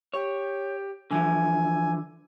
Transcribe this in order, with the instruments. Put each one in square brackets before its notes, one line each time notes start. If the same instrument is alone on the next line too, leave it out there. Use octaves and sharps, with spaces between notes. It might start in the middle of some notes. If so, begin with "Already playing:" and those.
[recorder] G4 [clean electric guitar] C#5
[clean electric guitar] D3 E3 F3 [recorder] G#5